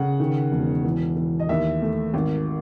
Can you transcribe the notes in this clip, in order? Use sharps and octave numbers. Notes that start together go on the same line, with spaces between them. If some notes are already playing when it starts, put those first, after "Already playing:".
Already playing: C#3 F#5
D#3
E1
E3
E3
D#5
D#2 E5
A3
G#1